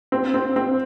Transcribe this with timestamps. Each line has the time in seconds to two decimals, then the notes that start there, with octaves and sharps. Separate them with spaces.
0.12 C4
0.34 C4
0.56 C4